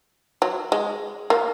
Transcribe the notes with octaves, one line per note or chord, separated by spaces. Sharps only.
F#3
G#3
A#3